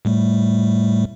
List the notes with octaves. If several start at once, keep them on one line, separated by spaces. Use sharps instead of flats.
A2 G3 A3